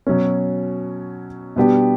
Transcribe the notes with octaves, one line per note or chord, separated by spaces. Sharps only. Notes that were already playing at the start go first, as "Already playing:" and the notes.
B2 F#3 C#4
B2 G3 B3 D4 G4